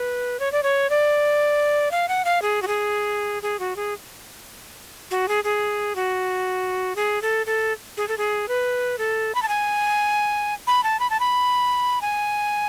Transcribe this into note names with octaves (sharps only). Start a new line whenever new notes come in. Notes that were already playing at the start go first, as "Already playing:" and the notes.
Already playing: B4
C#5
D5
C#5
D5
F5
F#5
F5
G#4
F#4
G#4
G#4
F#4
G#4
F#4
G#4
G#4
F#4
G#4
A4
A4
G#4
A4
G#4
B4
A4
B5
A5
G#5
B5
A5
B5
A5
B5
G#5